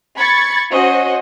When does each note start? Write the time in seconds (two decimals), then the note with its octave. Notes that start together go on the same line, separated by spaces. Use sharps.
0.16 B5 C#6 G#6 A6 C#7
0.71 C#4 F#4 C5 D#5